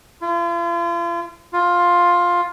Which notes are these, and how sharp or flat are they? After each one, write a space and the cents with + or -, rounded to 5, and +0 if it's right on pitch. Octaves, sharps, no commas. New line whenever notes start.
F4 -40
F4 +10